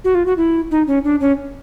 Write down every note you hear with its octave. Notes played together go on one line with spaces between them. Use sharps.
F#4
F4
F#4
E4
D#4
C#4
D4
C#4